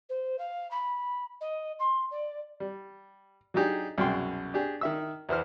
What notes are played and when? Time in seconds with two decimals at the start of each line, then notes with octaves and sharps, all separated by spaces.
0.09 C5
0.38 F5
0.71 B5
1.40 D#5
1.79 C6
2.11 D5
2.60 G3
3.54 F#3 D4 D#4 G4 G#4
3.98 C2 F#2 B2 G#4 G5 C6
4.54 D4 G4 G#4
4.81 D#3 E5 E6
5.29 E2 E3 C5 F6